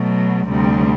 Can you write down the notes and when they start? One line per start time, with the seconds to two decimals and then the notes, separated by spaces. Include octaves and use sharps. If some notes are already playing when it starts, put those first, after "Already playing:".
Already playing: B2 F#3 A3
0.48 D2 C3 G3